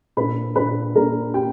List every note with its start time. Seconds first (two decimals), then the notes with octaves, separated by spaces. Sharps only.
0.17 A#2 A#3 D4 B4 B5
0.56 A#2 A#3 D4 B4 B5
0.95 A#2 A#3 D4 A#4 A#5
1.34 A#3 D4 G4 G5